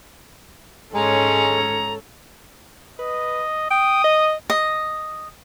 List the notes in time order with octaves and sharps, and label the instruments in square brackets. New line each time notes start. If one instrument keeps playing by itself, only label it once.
[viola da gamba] G#2 C#4 C#5 [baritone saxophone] G#3 [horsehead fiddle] A4 [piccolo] A#5
[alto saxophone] B4 [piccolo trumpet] D#5
[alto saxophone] G5 [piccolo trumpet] D#6
[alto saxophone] D#5
[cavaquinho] D#5